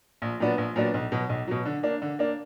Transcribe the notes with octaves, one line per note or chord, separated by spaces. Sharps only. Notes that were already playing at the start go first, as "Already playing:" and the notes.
A#1
A#2 F#3 B3 D4
A#1
A#2 F#3 B3 D4
B1
B2 F#3
B1
B2 F#3
D3
A#3 D4
D3
A#3 D4